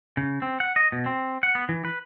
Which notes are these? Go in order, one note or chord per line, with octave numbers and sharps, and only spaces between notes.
C#3
C4
F#5
D#5
B2
C4
F#5
B3
E3
B4